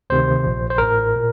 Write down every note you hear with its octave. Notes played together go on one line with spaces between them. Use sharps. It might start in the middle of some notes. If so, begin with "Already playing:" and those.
D2 C3 D#3 C5
A#1 A#2
C5
A1 A2 A#4
A#2